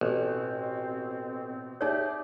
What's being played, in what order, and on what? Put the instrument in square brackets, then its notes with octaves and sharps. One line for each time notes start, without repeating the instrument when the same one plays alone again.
[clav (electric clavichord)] A1 [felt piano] B2 [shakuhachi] C4
[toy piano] D#4 C#5 [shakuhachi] G4 [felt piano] G#4 D5 E5